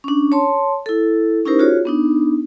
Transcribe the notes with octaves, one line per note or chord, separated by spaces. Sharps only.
C#4 D4
C#5 A5 C6
E4 A4
C#4 D#4 E4 G4 A#4 C5
F4 F#4 G#4 C#5
B3 D4 D#4